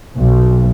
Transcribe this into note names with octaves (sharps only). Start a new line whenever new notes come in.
B1